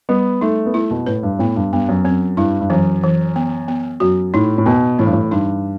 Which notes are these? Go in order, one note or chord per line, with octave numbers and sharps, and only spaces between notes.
G3 B3
A3 D#4
B3
A3 E4
B2
A2 B4
G2
A2 B3
G2
G2 B3
F#2
F#2 C4
G2 E4
G2
F#2 E3
E3
B3
B3
F#2 F#4
A2 D#4
A2
B2 B3
A2 E3
G2
A2
G2 D#4